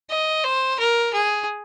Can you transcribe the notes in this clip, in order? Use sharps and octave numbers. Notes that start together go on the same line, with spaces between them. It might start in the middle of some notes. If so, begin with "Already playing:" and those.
D#5
C5
A#4
G#4